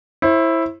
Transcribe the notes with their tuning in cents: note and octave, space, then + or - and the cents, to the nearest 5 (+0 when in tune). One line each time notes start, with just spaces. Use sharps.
E4 +0 C5 +35